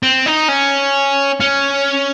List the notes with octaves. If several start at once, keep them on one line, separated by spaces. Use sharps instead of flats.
C4
D#4
C#4
C#4